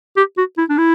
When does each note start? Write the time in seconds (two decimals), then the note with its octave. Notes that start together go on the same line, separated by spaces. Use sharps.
0.17 G4
0.37 F#4
0.58 E4
0.69 D4
0.78 E4